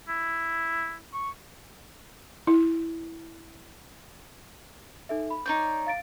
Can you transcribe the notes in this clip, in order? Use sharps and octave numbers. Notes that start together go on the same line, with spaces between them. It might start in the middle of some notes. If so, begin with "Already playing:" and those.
E4
C#6
E4
D#4 A4 E5
B5
D#4 C#5 D5 G6
F5 A6 D7